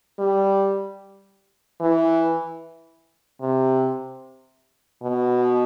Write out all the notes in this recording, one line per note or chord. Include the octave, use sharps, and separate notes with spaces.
G3
E3
C3
B2